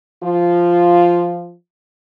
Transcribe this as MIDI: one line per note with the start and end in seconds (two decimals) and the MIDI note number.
0.23 1.54 53
0.23 1.54 65